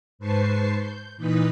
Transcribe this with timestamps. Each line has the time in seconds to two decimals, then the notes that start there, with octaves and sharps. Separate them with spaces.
0.19 G#2 B4 C5 A5 C#6 C7
0.78 G6
1.16 A#2 E3 D#4 B4 D#6 B6